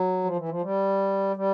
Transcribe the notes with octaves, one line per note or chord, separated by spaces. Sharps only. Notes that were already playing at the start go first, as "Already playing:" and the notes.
Already playing: F#3
F3
E3
F3
G3
G3